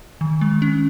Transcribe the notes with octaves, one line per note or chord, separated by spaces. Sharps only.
D#3
G#3
C#4